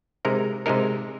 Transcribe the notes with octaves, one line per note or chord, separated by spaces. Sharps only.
C3 G#3 D#4 A#4
C3 G#3 D#4 A#4